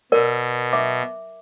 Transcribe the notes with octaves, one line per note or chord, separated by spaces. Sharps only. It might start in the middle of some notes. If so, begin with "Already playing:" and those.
B2 A#4 D5
E5 D6